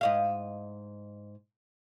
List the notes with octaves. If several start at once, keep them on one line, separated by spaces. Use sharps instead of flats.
G#2 D#5 F5